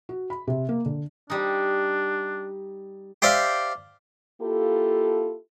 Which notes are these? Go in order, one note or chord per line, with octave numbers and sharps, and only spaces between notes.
F#4
B5
C3
A#3
D3
G3 D4 D#4
G4 C5 D5 E5 F5
A#3 E4 F4 G4 A4